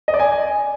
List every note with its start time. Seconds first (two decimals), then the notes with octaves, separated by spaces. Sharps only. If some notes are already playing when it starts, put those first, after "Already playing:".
0.08 D#5
0.14 D5
0.20 G#5